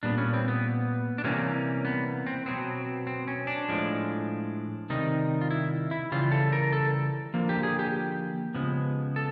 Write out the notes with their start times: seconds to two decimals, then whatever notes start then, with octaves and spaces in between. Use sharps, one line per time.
0.03 A#2 G3 B3 D4
0.18 C#4
0.34 C4
0.48 B3
1.18 D4
1.24 C3 E3 G3 A#3 C#4
1.85 B3
2.27 C4
2.46 B2 F#3 B3 C4
3.07 C4
3.28 C#4
3.47 D4
3.68 A2 F3 G#3
4.90 C3 D#3 G3 D#4
5.41 F4
5.51 E4
5.91 E4
6.12 C#3 E3 G3 F4
6.32 A4
6.52 A#4
6.73 A4
7.34 D3 F3 A#3
7.49 G4
7.63 G#4
7.79 G4
8.54 C#3 F3 G#3 B3
9.16 A4